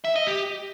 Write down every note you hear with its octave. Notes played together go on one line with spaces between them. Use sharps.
E5
D#5
G4